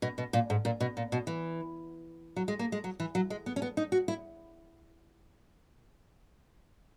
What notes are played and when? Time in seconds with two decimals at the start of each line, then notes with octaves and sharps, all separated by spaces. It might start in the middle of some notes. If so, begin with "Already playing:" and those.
0.02 B2
0.18 B2
0.33 A#2
0.50 G#2
0.65 A#2
0.80 B2
0.97 A#2
1.12 B2
1.27 E3
2.36 F#3
2.48 G#3
2.59 A#3
2.72 G#3
2.84 F#3
3.00 E3
3.15 F#3
3.30 G#3
3.46 B3
3.56 C#4
3.62 B3
3.77 D#4
3.92 F#4
4.08 E4